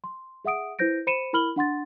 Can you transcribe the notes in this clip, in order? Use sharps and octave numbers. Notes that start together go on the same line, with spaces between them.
C6
G#4 E5 F#5 D#6 D7
E4 B4 C5 G6 A#6 D7
C5 B5 C#7 D#7 E7
E4 A#4 B5 F6 F#7 G7
D4 F#5 C6 A6